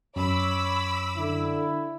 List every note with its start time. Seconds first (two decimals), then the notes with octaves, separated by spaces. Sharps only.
0.16 F#2 C#5 B5 D6 E6
1.17 D3 E4